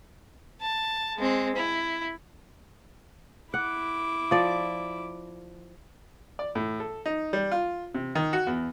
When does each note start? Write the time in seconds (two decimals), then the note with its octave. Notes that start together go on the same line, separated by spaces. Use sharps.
0.61 A5
1.18 G#3 C4
1.56 E4
3.54 E4 F#5 D6
4.31 F3 D5
6.39 D5
6.55 A2
6.80 A4
7.06 D#4
7.33 G3
7.52 F4
7.94 C3
8.15 D#3
8.33 F#4
8.47 E2